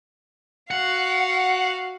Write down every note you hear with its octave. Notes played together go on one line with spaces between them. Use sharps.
F#4 F5 F#5